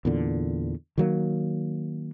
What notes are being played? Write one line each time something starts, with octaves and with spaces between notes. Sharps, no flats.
E2 A#2 D3
D#3 F#3 A#3